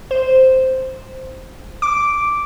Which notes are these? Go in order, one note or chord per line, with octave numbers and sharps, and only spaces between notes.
C5
D6